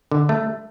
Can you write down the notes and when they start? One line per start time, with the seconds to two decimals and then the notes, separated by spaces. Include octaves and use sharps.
0.11 D3
0.29 A3